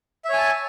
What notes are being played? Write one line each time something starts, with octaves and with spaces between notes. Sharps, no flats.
C#5 E5 G#5 A5